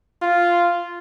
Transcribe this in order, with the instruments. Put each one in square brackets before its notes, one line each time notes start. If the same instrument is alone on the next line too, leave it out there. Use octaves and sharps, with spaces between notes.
[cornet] F4